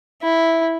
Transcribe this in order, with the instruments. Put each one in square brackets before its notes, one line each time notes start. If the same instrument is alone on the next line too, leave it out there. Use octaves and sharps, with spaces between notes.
[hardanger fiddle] E4